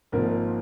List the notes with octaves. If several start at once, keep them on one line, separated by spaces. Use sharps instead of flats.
G#1 G#2 F3 A#3 D#4 A#4